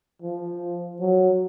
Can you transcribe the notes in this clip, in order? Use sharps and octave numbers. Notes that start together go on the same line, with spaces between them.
F3
F#3